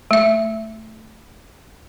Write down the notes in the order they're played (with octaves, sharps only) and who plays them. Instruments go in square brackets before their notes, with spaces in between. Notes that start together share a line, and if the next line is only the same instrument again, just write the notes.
[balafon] A3 E5